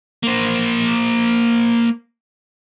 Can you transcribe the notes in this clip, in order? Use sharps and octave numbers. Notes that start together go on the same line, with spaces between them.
A#3 C5